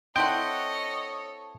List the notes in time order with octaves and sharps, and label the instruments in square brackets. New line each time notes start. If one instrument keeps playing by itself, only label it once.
[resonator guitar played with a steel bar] C4 E4 F#5 [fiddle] A4 C#5 [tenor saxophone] D#5 [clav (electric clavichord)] G5